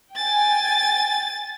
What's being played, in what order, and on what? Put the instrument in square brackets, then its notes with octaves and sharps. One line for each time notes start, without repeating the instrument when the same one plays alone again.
[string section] G5 G#5 [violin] A6